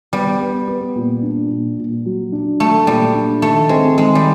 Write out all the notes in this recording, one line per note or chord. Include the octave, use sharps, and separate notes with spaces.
G3 B3
B3
B3
A#2
D4
A#2
A#2
F#3
D4
F#3 A3
A#2 G3
D4
D#3 A3
G#3 C4
D#3 G#3
G3